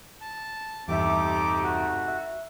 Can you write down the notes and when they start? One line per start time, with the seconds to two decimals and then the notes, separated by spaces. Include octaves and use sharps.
0.21 A5
0.88 E2 G2 C3 A3 D#4 G4 E5 D6
1.63 F#4
2.08 E5